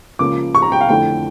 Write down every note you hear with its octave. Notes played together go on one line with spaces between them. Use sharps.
C#2 C#3 F3 A#3 D6
C#6
A#5
G5
F5
F2 D3 A3 E4 G5